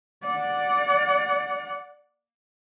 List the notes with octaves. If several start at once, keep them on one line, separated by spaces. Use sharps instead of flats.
D5 F#5